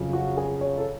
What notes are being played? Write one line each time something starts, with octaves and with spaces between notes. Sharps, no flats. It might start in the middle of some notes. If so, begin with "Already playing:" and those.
Already playing: F2 C#3 F#3
F#4
G#4
C#5
A4